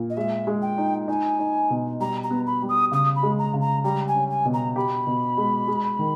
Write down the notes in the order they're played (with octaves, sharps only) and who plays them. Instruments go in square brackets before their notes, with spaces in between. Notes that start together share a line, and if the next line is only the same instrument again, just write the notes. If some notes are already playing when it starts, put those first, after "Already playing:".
Already playing: [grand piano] A#2
[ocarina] D#5
[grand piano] G#3 [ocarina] E5
[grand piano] G#3
[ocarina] G5
[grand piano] D#4
[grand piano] D#4 [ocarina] G#5
[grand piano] D#4
B2
[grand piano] G3 [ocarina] A#5
[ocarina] A#5
[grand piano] B3
[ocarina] B5
[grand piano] G3
[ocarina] D#6
[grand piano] C#3 [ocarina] D#6
[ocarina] B5
[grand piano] G#3
[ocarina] A#5
[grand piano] C#3
[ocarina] A#5
[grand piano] G3 [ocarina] A#5
[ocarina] G#5
[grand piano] C#4
[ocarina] G#5
[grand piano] B2
[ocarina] A#5
[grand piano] G4 [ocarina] B5
[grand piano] B2
G#3
G#3
D#3